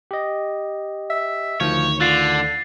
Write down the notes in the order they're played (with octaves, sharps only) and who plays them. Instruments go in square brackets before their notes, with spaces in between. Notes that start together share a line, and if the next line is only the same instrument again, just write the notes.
[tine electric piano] G4 D#5
[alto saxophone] E5
[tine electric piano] D2 D#3 [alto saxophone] F3 [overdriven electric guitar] C#5
[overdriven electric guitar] D3 [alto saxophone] F4 [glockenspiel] A6 C7